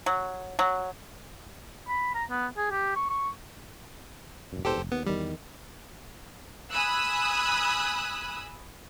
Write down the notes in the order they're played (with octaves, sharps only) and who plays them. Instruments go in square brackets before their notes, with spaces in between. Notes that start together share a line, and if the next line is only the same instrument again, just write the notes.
[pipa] F#3
F#3
[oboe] B5
A#5
B3
G#4
G4
C#6
C#6
[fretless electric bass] D#1 F#2
[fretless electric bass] E1 E2 [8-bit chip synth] G4 A4 C5
[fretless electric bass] F1
[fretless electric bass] D#2 [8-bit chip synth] B3
[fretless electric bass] E2 D#3 [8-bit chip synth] G3
[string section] G#5 B5 D#6 E6 F#6